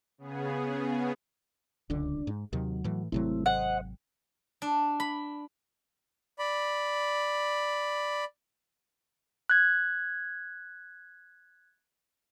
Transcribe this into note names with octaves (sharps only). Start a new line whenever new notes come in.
C#3 B3 G#4
D1 C#2 D3 D4
G#2
D#2 C3 D#3 F#3
A2 E3
G#1 C3 F#3 A3 C4 E4
C5 D#5 F#5
D4
B5
D5 B5
F#6 G#6